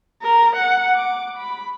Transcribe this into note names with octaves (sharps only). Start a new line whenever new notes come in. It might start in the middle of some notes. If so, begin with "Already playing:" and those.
A#4
F#5
D6
B5